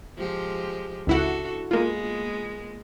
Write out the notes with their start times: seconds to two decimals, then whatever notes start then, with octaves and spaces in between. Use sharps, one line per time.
0.18 F3 G#3 G4
1.07 C#2 D4 E4 F#4 A4 F#5
1.71 G#3 A#3 B3 F4